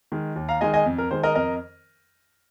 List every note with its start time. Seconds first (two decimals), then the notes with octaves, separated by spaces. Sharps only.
0.12 D#3 G#3
0.36 D#2
0.49 F5 A#5
0.61 D#3 G#3 D#5 G#5
0.74 D#5 G#5
0.86 F2
0.98 A#4
1.11 D#3 G#3 C5
1.23 A#4 D#5
1.35 F2 A#4 D#5